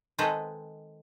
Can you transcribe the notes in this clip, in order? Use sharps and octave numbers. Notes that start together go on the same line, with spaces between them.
D#3 G#3 C4 D#4 A4 B4